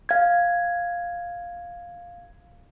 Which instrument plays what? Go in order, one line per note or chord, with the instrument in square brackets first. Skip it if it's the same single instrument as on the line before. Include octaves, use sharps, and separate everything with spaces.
[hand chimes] F5 G#6